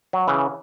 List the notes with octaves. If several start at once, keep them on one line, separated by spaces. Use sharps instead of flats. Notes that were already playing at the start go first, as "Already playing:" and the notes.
F#3
C#3 E3